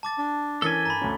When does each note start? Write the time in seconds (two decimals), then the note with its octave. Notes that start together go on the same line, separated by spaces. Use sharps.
0.03 A5 D6 A6
0.19 D4
0.62 E3 C#4 A4 A#4 G#5 A6 B6 G7
0.86 G2 A#5 B5
1.01 D2 C#4